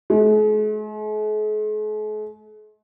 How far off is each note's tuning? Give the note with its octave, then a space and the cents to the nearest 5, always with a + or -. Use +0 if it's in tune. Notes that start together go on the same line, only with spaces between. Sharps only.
G#3 +45